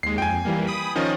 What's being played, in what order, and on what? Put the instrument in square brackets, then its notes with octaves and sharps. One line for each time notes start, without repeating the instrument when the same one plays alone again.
[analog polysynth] D#2 G#3 [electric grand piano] C7
[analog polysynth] F2 [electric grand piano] G5 G#5
[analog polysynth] E3 G3 A#3
B5 D#6
[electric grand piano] D#3 F3 C#4 [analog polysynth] D#5